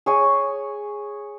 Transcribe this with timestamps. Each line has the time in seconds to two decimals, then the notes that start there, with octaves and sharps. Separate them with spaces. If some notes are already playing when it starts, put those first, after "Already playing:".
0.06 G#4 C#5 G#5